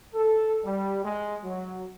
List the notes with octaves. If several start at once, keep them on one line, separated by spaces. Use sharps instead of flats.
A4
G3
G#3
F#3